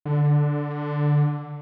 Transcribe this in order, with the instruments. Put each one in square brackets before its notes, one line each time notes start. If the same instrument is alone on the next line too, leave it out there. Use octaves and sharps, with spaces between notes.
[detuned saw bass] D3